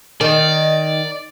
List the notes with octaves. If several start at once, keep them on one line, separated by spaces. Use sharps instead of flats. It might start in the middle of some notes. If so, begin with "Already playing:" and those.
D#3 D5 D#5